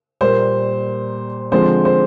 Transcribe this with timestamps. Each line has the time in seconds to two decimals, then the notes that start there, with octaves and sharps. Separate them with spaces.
0.21 A#2 G3 A#3 C5
1.52 D3 F3 G#3 C4 C5
1.85 C5